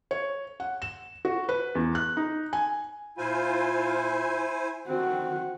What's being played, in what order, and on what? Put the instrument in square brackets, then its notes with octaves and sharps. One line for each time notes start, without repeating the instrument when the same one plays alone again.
[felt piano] C#5
F#5
E7
F#4
B4
E2
F#6
D#4
G#5
[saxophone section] A#2 F4 [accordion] E4 C5 G#5
[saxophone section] D3 C4 [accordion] D#3 [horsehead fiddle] F#4